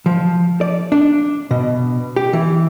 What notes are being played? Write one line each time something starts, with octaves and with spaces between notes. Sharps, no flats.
F3
D5
D4
B2
G4
E3